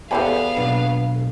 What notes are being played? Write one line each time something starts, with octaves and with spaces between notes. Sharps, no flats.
E2 B3 G4 A4 C5 F5 G#5 B5
B2 F#3 D4